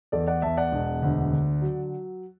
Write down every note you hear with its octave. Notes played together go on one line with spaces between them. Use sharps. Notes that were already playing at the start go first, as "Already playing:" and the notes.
E2 A4 D5
D5 F#5
E2 E5 A5
D5 F#5
E1
D2
D3
F#3